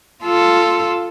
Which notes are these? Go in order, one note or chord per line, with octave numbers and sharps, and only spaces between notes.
F4 A4